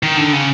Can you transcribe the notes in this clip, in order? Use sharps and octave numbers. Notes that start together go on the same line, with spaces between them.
D#3
D3
C#3